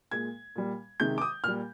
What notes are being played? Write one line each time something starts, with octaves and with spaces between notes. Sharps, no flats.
A#2 G#3 G#6
A#2 G3
C3 D#3 G#3 G6
D6
D#6
A#2 G3 F6